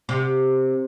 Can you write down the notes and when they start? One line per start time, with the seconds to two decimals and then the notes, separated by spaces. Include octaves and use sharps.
0.09 C3